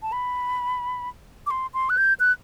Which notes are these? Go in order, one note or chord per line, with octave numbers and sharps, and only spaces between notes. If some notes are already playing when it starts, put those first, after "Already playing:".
A5
B5
D6
C6
C6
F#6
G6
F#6